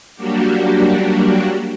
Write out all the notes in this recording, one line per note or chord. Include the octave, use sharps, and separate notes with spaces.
F#3 G3 A#3 D4 F#4 G4